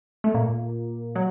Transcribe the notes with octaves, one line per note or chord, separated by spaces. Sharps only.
A3
A#2 A#3
F#3